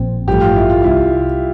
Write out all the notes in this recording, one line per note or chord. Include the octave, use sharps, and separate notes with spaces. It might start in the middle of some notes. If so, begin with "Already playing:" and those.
Already playing: A#1 A#2 F3 C4
A1 G2 F3 A3 G4
F4
E4
F4
C2 C3 G3 E4